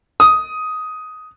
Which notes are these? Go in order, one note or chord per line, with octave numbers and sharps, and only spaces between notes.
D#6